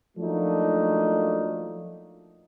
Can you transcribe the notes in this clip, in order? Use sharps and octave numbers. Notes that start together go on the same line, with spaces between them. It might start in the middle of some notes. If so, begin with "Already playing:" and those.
F3 F#3 A3 A#3 D4 D#4